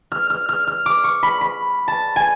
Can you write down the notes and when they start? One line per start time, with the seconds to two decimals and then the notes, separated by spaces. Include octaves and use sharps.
0.12 F6
0.30 F6
0.49 F6
0.67 F6
0.86 D6
1.04 C#6
1.23 B5
1.41 B5
1.88 A5
2.16 G#5